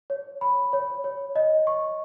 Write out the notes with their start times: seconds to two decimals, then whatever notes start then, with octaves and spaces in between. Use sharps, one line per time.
0.10 C#5
0.41 B5
0.73 C#5
1.04 C#5
1.36 D#5
1.67 C#6